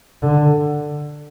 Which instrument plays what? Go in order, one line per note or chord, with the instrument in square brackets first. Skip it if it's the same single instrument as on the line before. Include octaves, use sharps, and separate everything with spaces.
[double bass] D3